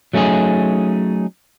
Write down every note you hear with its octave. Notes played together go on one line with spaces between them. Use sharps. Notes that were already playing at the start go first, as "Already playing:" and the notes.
F#3 A3 C#4 D#4 G#4